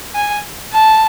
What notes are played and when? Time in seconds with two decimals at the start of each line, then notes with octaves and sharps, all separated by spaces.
0.15 G#5
0.73 A5